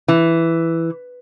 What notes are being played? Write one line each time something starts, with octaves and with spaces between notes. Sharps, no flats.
E3